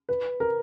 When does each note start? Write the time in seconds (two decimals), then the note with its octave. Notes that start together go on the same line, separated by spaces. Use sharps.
0.09 B4
0.40 A#4